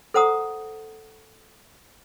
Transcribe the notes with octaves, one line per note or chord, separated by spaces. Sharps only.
A4 C5 F#5 A#5 D#6